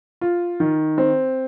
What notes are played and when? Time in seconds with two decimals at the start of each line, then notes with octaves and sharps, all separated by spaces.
0.21 F4
0.60 D#3
0.98 C4